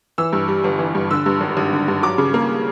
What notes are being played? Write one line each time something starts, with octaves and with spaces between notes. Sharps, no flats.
E3 E6
G2
G3
G1
E3
G2
D3 E6
G2
G#1
G#1
D3
G2
F#3 D6
C#3
A#3